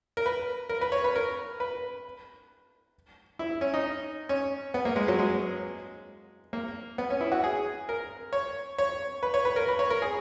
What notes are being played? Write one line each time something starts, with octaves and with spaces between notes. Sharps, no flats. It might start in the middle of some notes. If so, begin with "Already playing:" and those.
A#4
B4
A#4
B4
C#5
B4
A#4
B4
E4
C#4
D#4
C#4
B3
A#3
G#3
F#3
G#3
A#3
B3
C#4
E4
F#4
G#4
A#4
C#5
C#5
B4
C#5
B4
A#4
B4
C#5
A#4
G#4